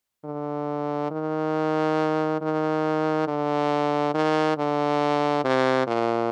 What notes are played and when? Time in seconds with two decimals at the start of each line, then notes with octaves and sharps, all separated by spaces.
0.25 D3
1.11 D#3
2.42 D#3
3.28 D3
4.14 D#3
4.58 D3
5.45 C3
5.87 A#2